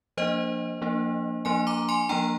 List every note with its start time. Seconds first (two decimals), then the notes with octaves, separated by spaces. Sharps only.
0.17 F3 A#3 D4 C5 D#5
0.82 F3 A#3 D4
1.45 F3 A#3 D4 G#5 C6
1.67 A#5 D6
1.89 G#5 C6
2.09 F3 A#3 D4 G5 A#5